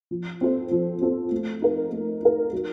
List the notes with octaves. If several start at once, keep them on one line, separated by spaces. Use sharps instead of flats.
F3
C4 F4 A4 C5
F3
C4 F4 A4 C5
A3
D#4 A#4
A3
D#4 A#4
F#3